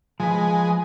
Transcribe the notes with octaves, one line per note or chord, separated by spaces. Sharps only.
F3 G#3 B4